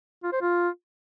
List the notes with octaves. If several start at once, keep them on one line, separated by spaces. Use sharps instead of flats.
F4
C5
F4